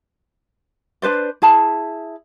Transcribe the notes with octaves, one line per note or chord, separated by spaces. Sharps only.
D4 B4 C5 D5
E4 G#4 A5 B5